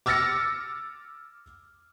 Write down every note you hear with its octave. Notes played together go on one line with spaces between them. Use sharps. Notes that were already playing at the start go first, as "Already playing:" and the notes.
D6 E6 F6 A6 A#6 C#7